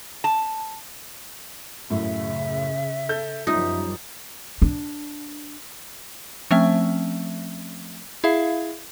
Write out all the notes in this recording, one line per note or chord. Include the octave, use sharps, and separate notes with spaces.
A5
F#2 A2 C#3 E5
A4 G6
F#2 F3 G3 D#4 E5
D4
F3 A3 C4 C#4 E5
E4 G#4 E5 F5